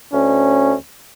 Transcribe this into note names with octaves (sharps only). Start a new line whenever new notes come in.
D2 C#4